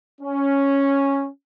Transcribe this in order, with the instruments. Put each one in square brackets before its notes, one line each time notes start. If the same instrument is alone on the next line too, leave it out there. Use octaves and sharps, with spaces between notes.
[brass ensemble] C#4